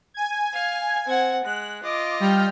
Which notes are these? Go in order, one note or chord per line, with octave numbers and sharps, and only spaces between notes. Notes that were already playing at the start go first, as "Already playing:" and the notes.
G#5 G#6
F5
C4 F#5
G#3 F#6
F4 D#5 D6
G3 G5 F6